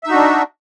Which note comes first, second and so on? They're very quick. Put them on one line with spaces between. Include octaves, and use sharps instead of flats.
E5 D#4 F#4 D4